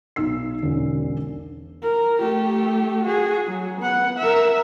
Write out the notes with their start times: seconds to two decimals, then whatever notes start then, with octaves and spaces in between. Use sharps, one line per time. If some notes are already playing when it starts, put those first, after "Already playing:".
0.16 B1 D#4 E6 C7
0.62 E1 B1 D3 C#4
1.83 A#4
2.21 A3 G4
3.04 F#4 G#4
3.47 F#3
3.80 B3 F#5
4.19 A#4 E5